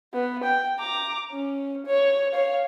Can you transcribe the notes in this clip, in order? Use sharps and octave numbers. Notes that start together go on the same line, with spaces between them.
B3
G5
A#5 D6
C#4
C#5
C#5 F5